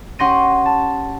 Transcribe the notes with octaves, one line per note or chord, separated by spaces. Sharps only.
C#4 G4 F#5 C6 A#6 D#7
A5